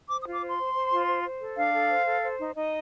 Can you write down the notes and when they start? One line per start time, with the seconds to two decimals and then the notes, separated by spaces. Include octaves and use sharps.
0.09 C5 D6
0.21 D#6
0.26 F4
0.33 D6
0.42 C5 C6
0.58 C5
0.75 C5
0.92 F4
1.07 C5
1.24 C5
1.41 A4
1.57 D4 F5
1.73 A4
1.90 C5
2.06 A4
2.23 C5
2.39 D#4
2.55 D#4 D#5